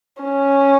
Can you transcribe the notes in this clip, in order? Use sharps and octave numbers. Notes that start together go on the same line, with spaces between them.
C#4